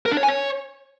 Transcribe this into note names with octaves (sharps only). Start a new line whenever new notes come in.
A#4
D4
C#5
G#5
C#5